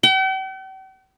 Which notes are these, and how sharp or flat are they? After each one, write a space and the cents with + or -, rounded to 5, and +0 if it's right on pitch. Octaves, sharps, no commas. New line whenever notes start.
G5 -45